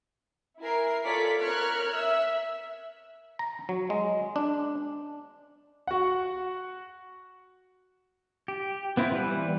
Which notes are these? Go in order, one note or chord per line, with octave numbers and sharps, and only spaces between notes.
E4 A#4 G#5 C7
F4 A4 C#5 D5 B6
A#4 C#5 F6 F#6 G#6
E5 E6
A#5
F#3
G#3
D4
F#4 F#5
G4
B3 C4 E4 F4
E3 G3 B4